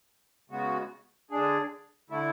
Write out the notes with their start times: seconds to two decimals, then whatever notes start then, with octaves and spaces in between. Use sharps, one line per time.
0.50 C#3 G#3 B3 F#4
1.30 D3 G#3 D4 G#4
2.10 D3 A3 E4